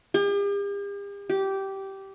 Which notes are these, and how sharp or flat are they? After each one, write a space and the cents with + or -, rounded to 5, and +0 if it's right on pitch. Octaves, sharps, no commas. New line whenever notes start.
G4 +45
G4 -15